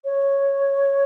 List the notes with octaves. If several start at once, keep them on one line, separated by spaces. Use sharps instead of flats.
C#5